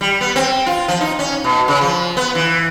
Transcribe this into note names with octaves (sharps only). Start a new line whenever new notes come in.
G3
B3
C4
F4
F3
D#4
C#4
B2
C#3
F3
B3
E3